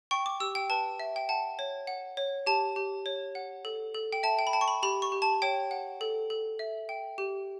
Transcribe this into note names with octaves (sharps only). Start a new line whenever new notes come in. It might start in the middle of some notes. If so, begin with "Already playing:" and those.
G5 C#6
D6
G4 E6
G5
B4 A5
E5
G5
F#5 A5
C#5
F#5
C#5
G4 A5
G4
C#5
F#5
A4
A4
G5
E5 A5
G5
B5
G5 A5
C#6
B5
G4 B5
C#6
G4
A5
C#5 G5
F#5
A4
A4
E5
G5
G4